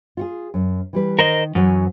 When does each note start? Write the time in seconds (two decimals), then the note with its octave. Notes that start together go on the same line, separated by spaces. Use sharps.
0.17 F4 F#4 G#4
0.54 F#2
0.93 E3 G3 B4
1.19 D#3 A#4 C5 D#5
1.55 F#2 E3 F#3 G#5